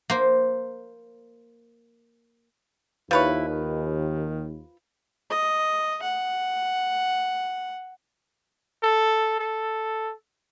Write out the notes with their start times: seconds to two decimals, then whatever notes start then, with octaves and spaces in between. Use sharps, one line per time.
0.10 A#3 C5
3.11 D#2 F3 E4 B4 C#5
3.48 D#3
5.30 D#5
6.02 F#5
8.83 A4
9.39 A4